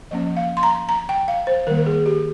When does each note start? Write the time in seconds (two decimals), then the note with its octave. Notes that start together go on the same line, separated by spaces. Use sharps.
0.11 F3 A#3 C#4 D#5
0.37 F5
0.57 C6
0.63 A#5
0.89 A#5
1.09 G5
1.28 F5
1.47 C5
1.67 D#3 A#4
1.69 G3 A#3
1.78 A#4
1.86 G#4
2.06 G4